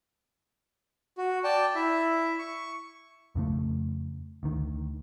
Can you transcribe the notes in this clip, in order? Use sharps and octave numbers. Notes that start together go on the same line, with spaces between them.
F#4
D5 G5 A5
E4 E5
C#6
F2 C#3 A3
D2 D#3